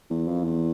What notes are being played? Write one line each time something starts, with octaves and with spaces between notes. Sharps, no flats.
E2
F2
E2